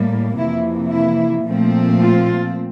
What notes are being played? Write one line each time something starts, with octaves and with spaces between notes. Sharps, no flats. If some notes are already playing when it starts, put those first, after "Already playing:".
Already playing: A2 G3 A#3
F2 C3 E3 A#3 E4
E4
A#2 F3 A3 C4
F4